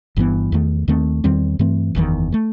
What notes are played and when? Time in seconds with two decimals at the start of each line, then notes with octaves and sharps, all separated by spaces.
0.16 G1 G2 E3 B3
0.52 E2 D#3 A3
0.88 D#2 D#3 A3 C4
1.24 E2 D#3 G3 C4
1.59 G2 E3 A3 C4
1.95 F#1 E2 C3 D#3
2.32 D#3 A3